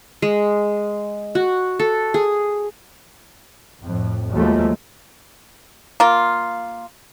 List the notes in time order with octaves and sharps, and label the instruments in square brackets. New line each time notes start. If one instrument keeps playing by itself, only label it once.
[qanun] G#3
F#4
A4
G#4
[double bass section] F2 A2
D#2 F3 F#3 G#3 A3
[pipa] A#3 F4